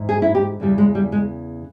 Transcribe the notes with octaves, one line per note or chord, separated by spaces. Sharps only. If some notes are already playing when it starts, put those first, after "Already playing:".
Already playing: G#2 E3
G#4
E4
G4
E2 C#3 E3 G3
G#3
G3
G#3